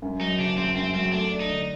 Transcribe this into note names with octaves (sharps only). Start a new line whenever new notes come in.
F#2
F#3 D#4
F#1 D4
F#1 C4
F#2 C4
F#3 C4
A3 D4
D4
D#4
D3